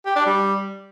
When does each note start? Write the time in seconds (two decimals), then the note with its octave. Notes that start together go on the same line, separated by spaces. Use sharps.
0.06 G4
0.16 D4
0.26 G3